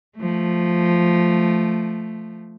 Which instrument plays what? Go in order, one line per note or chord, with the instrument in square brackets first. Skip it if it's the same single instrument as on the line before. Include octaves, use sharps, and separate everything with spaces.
[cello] F3 A3